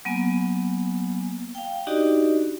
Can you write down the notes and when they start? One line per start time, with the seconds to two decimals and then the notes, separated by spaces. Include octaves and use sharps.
0.05 F#3 A#3 B3 G#5
1.55 F5 G5
1.87 D4 D#4 F#4 G4 D5 D#5